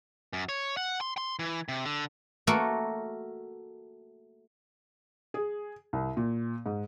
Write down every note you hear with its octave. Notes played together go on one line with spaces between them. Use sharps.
F#2
C#5
F#5
C6
C6
E3
C3
D3
A3 A#3 F#4 A4 A#4
G#4
C2
A#2
G#2